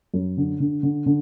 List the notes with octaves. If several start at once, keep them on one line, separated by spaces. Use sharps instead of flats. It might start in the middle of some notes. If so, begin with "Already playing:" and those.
F#2
D3
D3
D3
D3